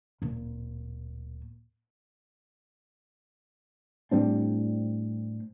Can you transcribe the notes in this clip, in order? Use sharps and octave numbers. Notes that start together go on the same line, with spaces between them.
D1 A#2
A2 G3 C4 D4